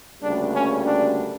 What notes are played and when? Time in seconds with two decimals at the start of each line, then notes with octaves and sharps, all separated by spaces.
0.22 D2 C#3 G3 A#3 D4
0.54 C#4
0.86 D4